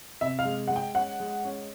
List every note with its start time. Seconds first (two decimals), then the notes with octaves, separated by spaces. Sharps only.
0.21 C3 E5
0.39 F5
0.45 G#3
0.67 G#3 F#5
0.76 G5
0.94 C#4 F#5
1.20 G#3
1.44 C#4